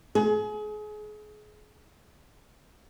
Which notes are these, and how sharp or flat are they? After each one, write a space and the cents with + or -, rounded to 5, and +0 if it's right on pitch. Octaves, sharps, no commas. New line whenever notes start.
G#4 +30